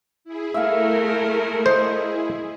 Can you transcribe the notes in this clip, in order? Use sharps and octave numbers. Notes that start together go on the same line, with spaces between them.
E4 G#4
A3 A#4 E5 F5
C5 D#5